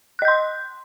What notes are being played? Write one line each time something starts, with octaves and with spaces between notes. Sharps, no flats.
D#5 C6 F#6 G6